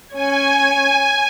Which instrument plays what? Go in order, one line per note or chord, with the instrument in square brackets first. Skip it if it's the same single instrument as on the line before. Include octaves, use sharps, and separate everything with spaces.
[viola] C#4 C#5 [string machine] G#5